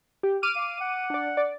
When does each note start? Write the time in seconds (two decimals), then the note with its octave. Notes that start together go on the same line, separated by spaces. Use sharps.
0.23 G4
0.43 D6 F6 D#7
0.56 F5
0.80 F#5
1.10 D4 D5
1.37 D5